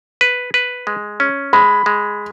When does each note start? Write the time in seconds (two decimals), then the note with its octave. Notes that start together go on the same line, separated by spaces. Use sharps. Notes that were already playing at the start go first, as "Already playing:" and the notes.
0.21 B4
0.54 B4
0.87 G#3
1.20 C#4
1.53 G#3 B5
1.86 G#3